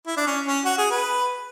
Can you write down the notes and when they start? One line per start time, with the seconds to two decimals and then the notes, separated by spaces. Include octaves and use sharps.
0.07 E4
0.17 D4
0.27 C#4
0.46 C#4
0.65 F#4
0.78 G#4
0.91 B4